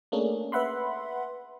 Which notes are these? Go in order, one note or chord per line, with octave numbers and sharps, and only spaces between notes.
A3 A#3 C#4 D4 G#4
B4 E5 F#5 B5 C6